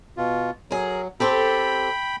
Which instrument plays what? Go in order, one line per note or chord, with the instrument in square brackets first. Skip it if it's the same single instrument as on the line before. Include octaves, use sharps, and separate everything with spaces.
[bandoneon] B2 F4
[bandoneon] F#3 [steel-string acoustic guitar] G#4 A#4
[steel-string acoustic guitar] C4 G4 A4 [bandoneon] G5 B5